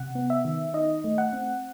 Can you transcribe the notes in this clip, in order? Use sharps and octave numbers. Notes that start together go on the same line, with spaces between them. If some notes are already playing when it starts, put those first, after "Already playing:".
Already playing: C3 F#5
B3
E5
D#3
D#4 D#5
A3
F#5
C4